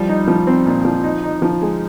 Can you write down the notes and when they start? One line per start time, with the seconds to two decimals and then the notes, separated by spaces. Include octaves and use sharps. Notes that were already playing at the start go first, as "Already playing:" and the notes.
Already playing: F3 G3
0.09 D#4
0.28 F3
0.47 C4
0.66 A#2
0.85 F3
1.04 D#4
1.24 D#4
1.42 F3
1.62 G#3